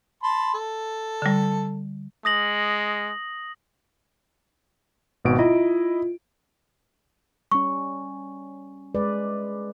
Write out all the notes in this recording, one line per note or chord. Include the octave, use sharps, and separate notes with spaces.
A5 B5 C6
A4
D3 G3
G#3 D#6 A#6 F#7
G#1 B2 D7
E4 F4 D#5
G3 C#4 C#6
G#3 B4 D5